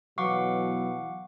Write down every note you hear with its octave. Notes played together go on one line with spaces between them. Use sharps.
B2 E3 F#3 F5 F#5 C#6 D6